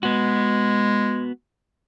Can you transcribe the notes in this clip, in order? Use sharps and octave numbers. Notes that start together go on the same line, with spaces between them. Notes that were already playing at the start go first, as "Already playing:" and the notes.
G#3 B3 F#4